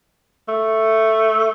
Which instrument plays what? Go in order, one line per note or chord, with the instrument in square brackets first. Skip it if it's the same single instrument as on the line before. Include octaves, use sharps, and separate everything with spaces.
[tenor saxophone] A3